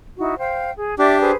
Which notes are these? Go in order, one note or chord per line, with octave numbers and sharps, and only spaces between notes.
D#4 E4 F#4
C5 F5 G5
G#4
D4 G4 D5 E5 D6
G#4 B4 C5